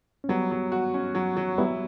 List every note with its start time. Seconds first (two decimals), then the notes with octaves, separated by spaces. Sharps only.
0.24 C#4
0.29 F#3 G3 B3
0.51 F#3
0.72 F#4
0.94 C#4
1.15 F#3
1.37 F#3
1.58 G3 B3 E4